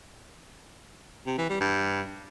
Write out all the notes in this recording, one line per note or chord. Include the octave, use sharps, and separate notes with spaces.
C3
E3
G3
G2